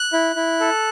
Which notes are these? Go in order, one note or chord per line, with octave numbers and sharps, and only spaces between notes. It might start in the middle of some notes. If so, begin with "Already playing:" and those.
Already playing: F#6
E4
E4
A4